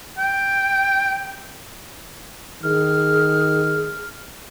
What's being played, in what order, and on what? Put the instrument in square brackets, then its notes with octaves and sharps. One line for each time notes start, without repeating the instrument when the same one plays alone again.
[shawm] G5
[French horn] D#3 [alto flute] G#4 [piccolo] F6